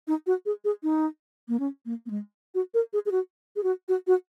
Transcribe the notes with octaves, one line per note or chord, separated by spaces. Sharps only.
D#4
F#4
G#4
G#4
D#4
A#3
C#4
A#3
A#3
G#3
F#4
A#4
G#4
G#4
F#4
G#4
F#4
F#4
F#4